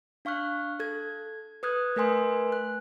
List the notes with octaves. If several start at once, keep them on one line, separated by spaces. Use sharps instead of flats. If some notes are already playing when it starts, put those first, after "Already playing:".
D4 F5 C#6 F6 F#6
A4 G#6
B4 D#6 F#6 G#6
A3 A#4 B4 G#5 C6
F#6